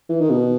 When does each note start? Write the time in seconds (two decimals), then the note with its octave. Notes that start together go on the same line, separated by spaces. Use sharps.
0.09 E3
0.21 D#3
0.30 B2